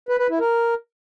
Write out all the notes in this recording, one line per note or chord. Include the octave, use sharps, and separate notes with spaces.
B4
B4
E4
A#4